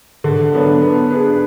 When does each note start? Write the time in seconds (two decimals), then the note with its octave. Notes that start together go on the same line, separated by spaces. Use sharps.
0.24 D3
0.53 F#3 B3 D4
0.82 B3
1.10 D4 G#4 B4